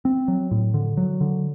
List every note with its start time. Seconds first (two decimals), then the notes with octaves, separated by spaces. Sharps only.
0.05 C4
0.28 F#3
0.51 A2
0.74 D3
0.97 F#3
1.21 D3